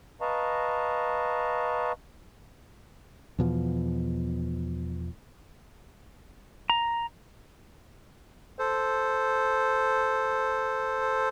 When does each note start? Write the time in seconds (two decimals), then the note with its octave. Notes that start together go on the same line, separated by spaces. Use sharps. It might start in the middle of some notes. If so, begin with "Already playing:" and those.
0.21 B4 D#5 F5 A5 A#5 C#6
3.39 E2 B2 F3
6.70 A#5
8.59 A4 C5